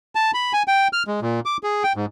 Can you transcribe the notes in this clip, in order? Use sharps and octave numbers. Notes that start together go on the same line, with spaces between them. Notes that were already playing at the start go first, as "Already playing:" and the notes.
A5
B5
G#5
G5
F6
G#3
A#2
D6
G#4
G5
G#2